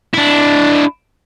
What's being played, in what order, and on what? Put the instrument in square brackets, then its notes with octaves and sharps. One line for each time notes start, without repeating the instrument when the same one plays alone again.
[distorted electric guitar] D4 E4